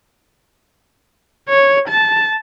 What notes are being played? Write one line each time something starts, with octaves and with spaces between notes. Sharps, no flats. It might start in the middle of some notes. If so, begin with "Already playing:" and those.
C#5
A5